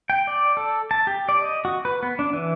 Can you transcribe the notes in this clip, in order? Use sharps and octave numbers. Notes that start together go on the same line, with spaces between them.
G5
D5
A4
A5
G4
D5
D#5
F#4
B4
B3
D4
E3